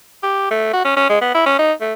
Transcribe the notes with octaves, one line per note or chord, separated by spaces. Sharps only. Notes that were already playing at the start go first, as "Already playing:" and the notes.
G4
A3
F#4
C#4
C#4
G#3
B3
E4
C#4
D#4
A3